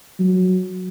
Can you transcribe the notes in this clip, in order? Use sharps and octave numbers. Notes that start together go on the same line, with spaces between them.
F#3